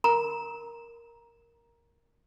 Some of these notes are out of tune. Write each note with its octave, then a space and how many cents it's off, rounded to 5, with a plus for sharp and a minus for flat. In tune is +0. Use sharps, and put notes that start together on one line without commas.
A#4 +0 A#5 +15